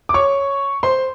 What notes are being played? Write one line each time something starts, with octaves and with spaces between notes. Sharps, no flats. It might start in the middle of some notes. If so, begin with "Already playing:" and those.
D6
C#5 C#6
C5 C6